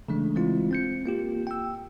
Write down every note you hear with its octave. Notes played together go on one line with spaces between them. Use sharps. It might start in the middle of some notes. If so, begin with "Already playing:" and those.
C#3 E3 G#3 A3 D4
E3 G#3 C4 E4 F4
C4 G6 C#7
A#3 F4 G4
G5 E6